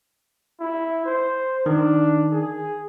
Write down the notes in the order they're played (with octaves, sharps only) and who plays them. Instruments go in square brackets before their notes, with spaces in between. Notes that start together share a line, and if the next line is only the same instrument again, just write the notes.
[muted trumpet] E4
C5
[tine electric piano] D#3 [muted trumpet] D4
[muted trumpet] G#4